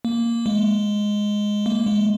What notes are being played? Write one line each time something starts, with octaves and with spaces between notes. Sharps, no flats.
A#3
G#3
A#3
G#3